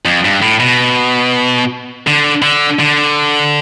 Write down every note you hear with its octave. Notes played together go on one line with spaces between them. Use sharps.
F2
G2
A2
B2
D3
D3
D3